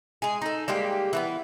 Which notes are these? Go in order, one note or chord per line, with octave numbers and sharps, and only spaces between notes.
G#3 G#4
D#4 A4
G3 G#3 A#3 G4
E3 A#3 B3